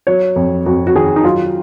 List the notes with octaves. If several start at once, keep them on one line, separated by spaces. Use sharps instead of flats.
F#3 C#5
F2
F2 F#4
F#4
D#3 G#4
D#4
F#3 F4